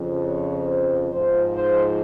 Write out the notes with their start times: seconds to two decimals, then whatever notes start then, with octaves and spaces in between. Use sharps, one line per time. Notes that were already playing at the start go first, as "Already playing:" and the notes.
Already playing: F2 C#3 F3
0.24 C#5
0.68 C5
1.11 G#2 F3 C5
1.54 C5